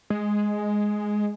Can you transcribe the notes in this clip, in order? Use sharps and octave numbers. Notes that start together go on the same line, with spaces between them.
G#3